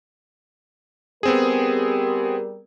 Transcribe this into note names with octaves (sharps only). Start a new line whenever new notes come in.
G3 B3 C4 G4 G#4 A#4